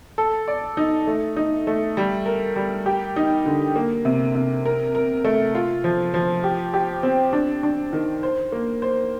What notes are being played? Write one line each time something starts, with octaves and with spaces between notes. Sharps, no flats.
A4
D5
D#4
A3
D#4
A3
G3
A#4
G3
G4
D#4
D3
A#3
C3
C3
A#4
A#4
A3
F4
F3
F3
G4
G4
C4
D4
D4
D#3
C5
A#3
C5